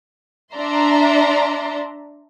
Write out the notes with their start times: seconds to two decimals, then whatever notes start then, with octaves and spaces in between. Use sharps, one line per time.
0.55 D4 D5 E5 A#5 C6